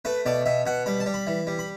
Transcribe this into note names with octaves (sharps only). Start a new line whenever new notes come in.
A3 B4
B2 D5
B2 E5
B2 F#5
G3 B5
A5
G3
B5
E3
G3
B5